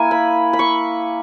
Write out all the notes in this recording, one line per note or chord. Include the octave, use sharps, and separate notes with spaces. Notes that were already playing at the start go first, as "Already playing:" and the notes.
Already playing: A#3 E4 G#5
B5
B5
C#6